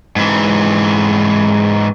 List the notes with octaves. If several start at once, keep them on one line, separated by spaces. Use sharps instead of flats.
G#2 E3